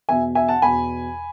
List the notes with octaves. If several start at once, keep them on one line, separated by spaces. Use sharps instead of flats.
E2 B2 E5 G#5
E5 G#5
F#5 A5
E2 B2 G#5 B5